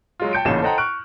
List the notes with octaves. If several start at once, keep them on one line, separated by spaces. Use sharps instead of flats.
F#3 G#3 F4
G5 A5 G6 C#7 D7
A1 A#2 C#3 D#4 A5 E7
A4 C5 D#5 F#5 G5 A#5
C#6 F6 F#6 D7